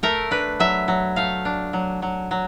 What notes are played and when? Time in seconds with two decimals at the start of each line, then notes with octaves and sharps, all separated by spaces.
0.03 A3 A#4
0.31 D4 B4
0.60 F#3 E5
0.88 F#3
1.16 A3 F5
1.45 D4
1.73 F#3
2.02 F#3
2.31 F#3